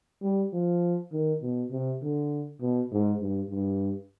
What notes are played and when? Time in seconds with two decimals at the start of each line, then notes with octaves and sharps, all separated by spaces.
0.22 G3
0.53 F3
1.12 D#3
1.42 B2
1.71 C3
2.02 D3
2.61 B2
2.92 G#2
3.21 G2
3.51 G2